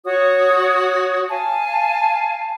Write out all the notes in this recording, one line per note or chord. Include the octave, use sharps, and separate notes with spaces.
F#4 C#5 D#6
F5 G#5 A5